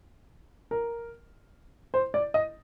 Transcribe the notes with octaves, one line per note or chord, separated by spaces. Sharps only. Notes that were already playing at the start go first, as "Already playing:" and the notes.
A#4
C5
D5
D#5